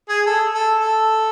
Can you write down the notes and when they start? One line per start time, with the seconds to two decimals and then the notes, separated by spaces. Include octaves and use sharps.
0.09 G#4
0.26 A4
0.54 A4
0.80 A4